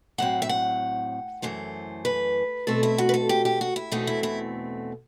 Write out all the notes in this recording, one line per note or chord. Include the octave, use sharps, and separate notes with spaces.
A2 F#3 C4 F#5
E5
F#5
F#2 E3 A3 C5
B4
B2 A3 C4 A4
E4
F#4
B4
A4
G4
G4
F#4
E4
E2 B2 A3 C4 D#4
E4
E4